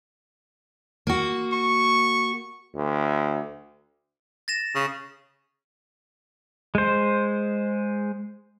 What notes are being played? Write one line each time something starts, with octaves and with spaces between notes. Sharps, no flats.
A#3 F#4
C#6
D2
A6 A#6 E7
C#3
G#3 C5